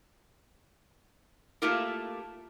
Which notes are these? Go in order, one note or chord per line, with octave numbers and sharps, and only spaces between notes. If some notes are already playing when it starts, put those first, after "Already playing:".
A3 A#3 E4 F4 G4 A#4